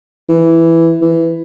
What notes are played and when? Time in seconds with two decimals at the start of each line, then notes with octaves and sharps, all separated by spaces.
0.29 E3
1.01 E3